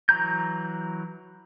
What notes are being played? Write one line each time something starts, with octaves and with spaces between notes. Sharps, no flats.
E3 F#3 A#5 G6